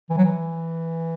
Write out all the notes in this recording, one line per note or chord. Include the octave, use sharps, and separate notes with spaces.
E3
F#3
E3